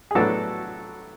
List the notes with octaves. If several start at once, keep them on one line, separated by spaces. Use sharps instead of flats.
G#4
A2 F#3 B3 D4 F#4 A4